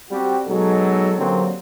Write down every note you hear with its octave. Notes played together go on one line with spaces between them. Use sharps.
G3 C4 F#4 G4
B2 F#3 G#3 D#4 A4
D3 F#3 G3 A#3 C4 C#4